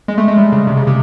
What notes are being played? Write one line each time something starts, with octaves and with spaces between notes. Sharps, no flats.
G#3
A3
G#3
G3
C#3
C3
C#3
C3